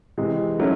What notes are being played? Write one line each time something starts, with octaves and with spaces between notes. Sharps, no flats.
C3 E3 G#3
F#3 A3 C#4 E4